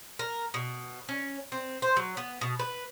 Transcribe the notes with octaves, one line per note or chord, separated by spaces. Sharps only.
A#4
B2
C#4
C4
C5
F#3
B3
B2
B4